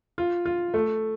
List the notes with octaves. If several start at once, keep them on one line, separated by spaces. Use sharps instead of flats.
F4
F4
A3